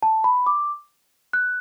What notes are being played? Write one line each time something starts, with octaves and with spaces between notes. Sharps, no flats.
A5
B5
D6
F#6